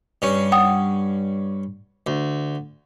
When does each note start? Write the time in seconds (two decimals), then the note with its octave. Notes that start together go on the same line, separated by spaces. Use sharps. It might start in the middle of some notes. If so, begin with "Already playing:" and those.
0.22 G2 C#4
0.52 F#5 G5 D#6
2.07 D2